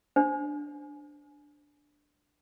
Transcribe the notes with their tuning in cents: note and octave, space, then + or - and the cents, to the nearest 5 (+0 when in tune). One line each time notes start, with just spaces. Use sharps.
D4 +0 C5 +0